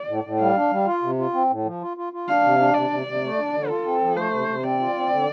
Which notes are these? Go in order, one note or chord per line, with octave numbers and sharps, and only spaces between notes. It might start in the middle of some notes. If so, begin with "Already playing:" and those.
Already playing: D5
A2
A2
G3 F5
D4
G3
F4
C3
F4
C4
A2
F3
F4
F4
F4
D4 F5
C3
D4
C3 D5
C3
C3
A3
D4
D3
F4 A4
C4
F3
A3 C5
C3
C3
C4 D5
F4
C4
D3